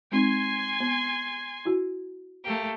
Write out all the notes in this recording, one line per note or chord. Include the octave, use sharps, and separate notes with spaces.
G#3 C4 D#4 G#5 C6 G#6
B3
E4 F#4
A3 A#3 G4